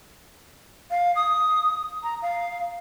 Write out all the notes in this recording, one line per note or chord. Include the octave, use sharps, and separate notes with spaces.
F5
D#6
A#5
F5